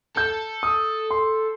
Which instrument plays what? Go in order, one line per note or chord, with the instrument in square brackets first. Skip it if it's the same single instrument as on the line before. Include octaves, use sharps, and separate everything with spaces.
[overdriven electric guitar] A4 [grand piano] G6
[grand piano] D#6
C6